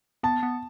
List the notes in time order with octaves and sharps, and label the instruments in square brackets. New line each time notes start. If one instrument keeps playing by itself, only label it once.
[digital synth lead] B3 [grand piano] A5
[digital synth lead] B3